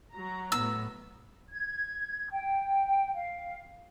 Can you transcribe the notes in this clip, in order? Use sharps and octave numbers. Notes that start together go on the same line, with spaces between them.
F#3 A#5
A2 B3 E6
G#6
G5
F5